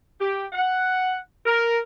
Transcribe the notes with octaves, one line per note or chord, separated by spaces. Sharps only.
G4
F#5
A#4